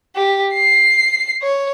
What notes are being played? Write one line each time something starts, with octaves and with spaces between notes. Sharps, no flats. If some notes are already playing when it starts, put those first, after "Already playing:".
G4
C7
C#5